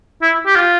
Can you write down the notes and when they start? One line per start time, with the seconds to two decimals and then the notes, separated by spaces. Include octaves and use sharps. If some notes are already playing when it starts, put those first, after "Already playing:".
0.22 E4
0.46 G4
0.56 F4